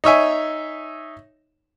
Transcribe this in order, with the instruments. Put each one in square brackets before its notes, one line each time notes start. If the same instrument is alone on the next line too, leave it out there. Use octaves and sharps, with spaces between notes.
[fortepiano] D#4 C#5 E5 G#5